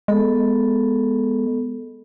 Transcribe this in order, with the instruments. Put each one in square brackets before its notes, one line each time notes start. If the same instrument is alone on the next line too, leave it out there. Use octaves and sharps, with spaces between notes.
[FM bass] G#3 [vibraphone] B3 A4